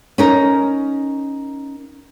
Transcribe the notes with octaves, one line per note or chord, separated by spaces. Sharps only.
C#4 D#4 A#4